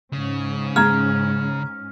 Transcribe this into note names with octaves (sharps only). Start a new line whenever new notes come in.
G#2 C#3 C#4
G#3 A#5 F6 G#6